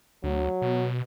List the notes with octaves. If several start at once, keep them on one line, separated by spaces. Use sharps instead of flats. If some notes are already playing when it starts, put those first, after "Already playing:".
D2 F#3
B2